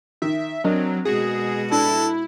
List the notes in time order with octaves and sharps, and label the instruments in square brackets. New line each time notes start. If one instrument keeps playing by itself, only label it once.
[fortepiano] D#3 [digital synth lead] E5
[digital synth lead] F#3 [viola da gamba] C4 [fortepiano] D4 A#4 D#5
[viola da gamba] B2 G#3 F#4 [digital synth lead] G#4
[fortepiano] D4 [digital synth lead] E4 [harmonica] A4